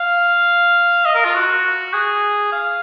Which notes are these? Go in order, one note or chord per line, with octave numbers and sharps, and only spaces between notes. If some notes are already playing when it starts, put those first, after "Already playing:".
Already playing: F5
D#5
A#4
F4
F#4
G#4
F5